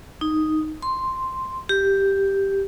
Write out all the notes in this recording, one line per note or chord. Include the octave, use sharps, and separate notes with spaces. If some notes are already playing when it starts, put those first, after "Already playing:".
D#4
C6
G4